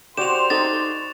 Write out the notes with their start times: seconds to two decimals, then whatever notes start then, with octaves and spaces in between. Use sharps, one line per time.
0.17 F#4 G4 C5 D5 C6 E7 F7
0.50 D#4 G4 A4 A6